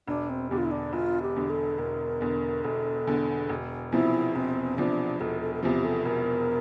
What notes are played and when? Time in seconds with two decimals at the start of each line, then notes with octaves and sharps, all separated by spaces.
0.07 E1 D4
0.29 C4
0.50 E2 D3 G4
0.58 F4
0.65 E4
0.71 D4
0.93 E1 F4
1.22 G4
1.36 E2 D3
1.50 A4
1.78 E1 A#4
2.21 E2 D3
2.63 E1 A4
3.07 E2 D3
3.49 E1
3.92 E2 C3 F3 E4
4.35 E1 C4
4.78 E2 C3 F3 D4
5.20 E1 A4
5.41 A4
5.55 A4
5.63 E2 C3 F3 G4
5.84 A4
6.05 E1 A#4